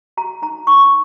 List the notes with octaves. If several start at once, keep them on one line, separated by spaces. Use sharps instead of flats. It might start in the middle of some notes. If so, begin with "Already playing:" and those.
F#4 A#5
D#4 A#5
D#4 C#6